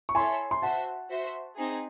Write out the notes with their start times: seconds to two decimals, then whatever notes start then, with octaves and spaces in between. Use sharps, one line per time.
0.09 C#6
0.15 E4 A4 C#5 E5 G#5 C6
0.51 C6
0.62 F#4 C5 E5 F#5 A5
1.10 F#4 C5 E5
1.57 C4 D#4 G#4